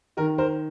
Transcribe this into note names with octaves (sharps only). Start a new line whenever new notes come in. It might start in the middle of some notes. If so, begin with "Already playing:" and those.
D#3 A#4
A#4 C5